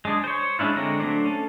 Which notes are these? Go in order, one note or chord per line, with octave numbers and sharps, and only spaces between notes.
G#3 D4 G#4
C5 C#5
G#3 C#4 D4 E4 F4
D3 G#3 C4 C#5 A#5
F#3 A3 D4 C5 D5
C#4 A4